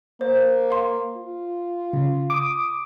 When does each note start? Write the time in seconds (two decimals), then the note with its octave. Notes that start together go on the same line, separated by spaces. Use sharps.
0.21 A#3 C5
0.70 F5 C6
1.17 F4
1.93 C#3
2.30 D6 D#6